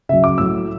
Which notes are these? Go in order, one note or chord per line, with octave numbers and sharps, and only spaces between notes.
C#3 F#3 E5
D6
A2 F#3 E6